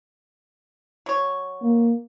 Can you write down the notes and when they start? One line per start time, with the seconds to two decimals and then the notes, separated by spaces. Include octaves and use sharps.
1.06 F#3 C#5
1.62 A#3